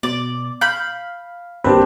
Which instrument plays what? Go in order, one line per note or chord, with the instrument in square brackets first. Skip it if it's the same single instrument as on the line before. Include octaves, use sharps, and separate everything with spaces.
[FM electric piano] B2 [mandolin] D5
[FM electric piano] F5 [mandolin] B5 G6
[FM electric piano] G1 A#3 B4 [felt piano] C4 D4 G4